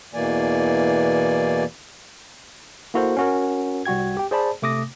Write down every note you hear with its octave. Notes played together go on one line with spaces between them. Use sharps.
E2 B2 E3 A#3 D5 G#5
A#3 E4 F#4 A4 A#4 C5
C#4 F#4 A#4
C2 G3 F#4 G5 G#6
G4 G5
G#4 C5 D5 A5 B5
C3 A3 D6 D#6 A#6